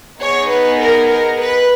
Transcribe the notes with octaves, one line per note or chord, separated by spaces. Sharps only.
B3 D#4 G#4 C#5
B4
A#4
A#4
B4